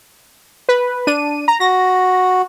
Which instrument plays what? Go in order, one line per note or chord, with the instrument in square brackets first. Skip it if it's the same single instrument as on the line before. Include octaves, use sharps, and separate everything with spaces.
[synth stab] B4
D4 D#7
A#5
[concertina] F#4 [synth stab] A#6